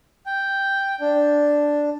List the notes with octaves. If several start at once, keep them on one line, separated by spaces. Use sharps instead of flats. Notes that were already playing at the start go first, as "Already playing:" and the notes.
G5
D4